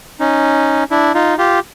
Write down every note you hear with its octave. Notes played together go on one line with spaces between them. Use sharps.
C#4 D#4
D4 E4
D#4 F4
F4 G4